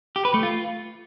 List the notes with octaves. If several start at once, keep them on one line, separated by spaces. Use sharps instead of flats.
G4
B4
A3
F4